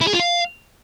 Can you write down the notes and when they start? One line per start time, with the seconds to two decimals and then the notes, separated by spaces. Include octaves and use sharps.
0.01 E4
0.07 G#4
0.13 F4
0.20 F5